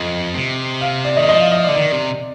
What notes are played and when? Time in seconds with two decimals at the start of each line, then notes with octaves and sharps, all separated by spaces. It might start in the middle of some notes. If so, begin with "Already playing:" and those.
Already playing: F2 D#5
0.34 C3
0.81 F5
1.05 D5
1.17 D#3 D#5
1.29 F3 D#5
1.40 F5
1.52 D#5
1.64 D5
1.68 D3
1.76 D#3 D5
1.92 C3